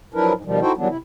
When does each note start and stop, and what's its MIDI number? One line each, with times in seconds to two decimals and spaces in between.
0.14 0.33 53
0.14 0.33 54
0.14 0.33 62
0.14 0.33 64
0.14 0.33 70
0.14 0.33 71
0.33 0.42 44
0.45 0.60 47
0.45 0.60 51
0.45 0.60 53
0.45 0.60 55
0.61 0.73 63
0.61 0.73 64
0.61 0.73 66
0.61 0.73 69
0.61 0.73 72
0.61 0.73 79
0.77 0.88 51
0.77 0.88 52
0.77 0.88 54
0.77 0.88 55
0.77 0.88 59
0.77 0.88 62
0.89 0.97 48
0.89 0.97 64